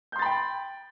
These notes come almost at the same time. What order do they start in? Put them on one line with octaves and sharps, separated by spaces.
G6 C6 A6 B5 G5